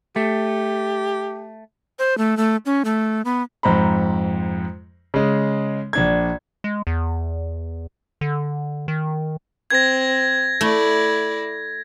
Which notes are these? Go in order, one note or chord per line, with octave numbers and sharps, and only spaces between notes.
A3 G4
C5
A3
A3
C#4
A3
B3
F2 G#2 C5 A#5 B5
C#3 G#3
A#1 D4 G#6
G#3
E2
D3
D#3
C4 G#6 A#6
A3 E4 D5